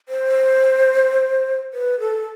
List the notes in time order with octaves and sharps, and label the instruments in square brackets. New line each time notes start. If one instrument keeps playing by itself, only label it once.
[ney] C5
B4
A4